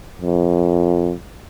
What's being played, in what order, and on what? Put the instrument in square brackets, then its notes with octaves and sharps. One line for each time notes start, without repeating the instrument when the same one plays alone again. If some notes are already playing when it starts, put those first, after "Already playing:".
[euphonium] F2